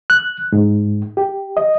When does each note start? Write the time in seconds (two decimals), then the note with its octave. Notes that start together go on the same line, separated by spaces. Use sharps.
0.10 F#6
0.52 G#2
1.17 G4
1.57 D#5